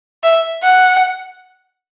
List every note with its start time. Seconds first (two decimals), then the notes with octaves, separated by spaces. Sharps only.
0.23 E5
0.63 F#5